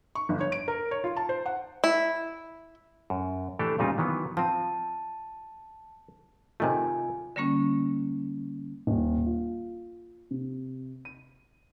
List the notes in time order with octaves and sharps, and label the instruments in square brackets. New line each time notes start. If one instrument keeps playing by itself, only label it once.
[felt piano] C#6
G1
C#5
D7
A#4
C#5
F4
A5
C5
F#5
[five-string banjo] E4
[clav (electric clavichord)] F#2
E3 A3 D4 G4 A4 A5
F2 A#2 C#3 G3 D#4 F4
D#3 E3 F#3 B3
[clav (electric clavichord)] F3 C4 [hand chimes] A5
[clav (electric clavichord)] C3 D#3 A3 [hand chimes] F4 G#5
[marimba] D3 G3 A#3 C#4
[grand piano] D#1
F4
C3
D#7